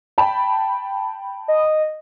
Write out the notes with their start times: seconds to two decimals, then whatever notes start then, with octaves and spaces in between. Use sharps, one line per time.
0.18 G5 A5 B5
1.48 D#5